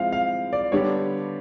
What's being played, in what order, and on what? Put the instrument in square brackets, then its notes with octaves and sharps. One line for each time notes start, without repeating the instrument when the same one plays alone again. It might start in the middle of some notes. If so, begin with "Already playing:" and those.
Already playing: [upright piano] F3 G#3 C4 E4 [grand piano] F5
[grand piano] F5
D5
[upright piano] D3 G3 B3 D4 G4 [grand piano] C#5